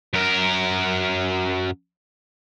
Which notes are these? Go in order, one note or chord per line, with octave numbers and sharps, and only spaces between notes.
F#2 A#4